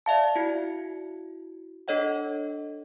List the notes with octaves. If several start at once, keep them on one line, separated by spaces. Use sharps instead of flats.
D5 E5 F5 A5
E4 F#4 G#6 C#7
D4 A4 C#5 D#5 F#5